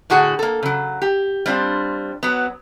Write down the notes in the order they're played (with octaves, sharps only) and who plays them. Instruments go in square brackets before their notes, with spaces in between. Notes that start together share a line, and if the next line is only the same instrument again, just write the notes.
[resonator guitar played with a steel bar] A2 D3 F#4 G#4 F#5
A#3 A4
C#3 F#3
G4
G3 C4 D4 F4
F#3 B3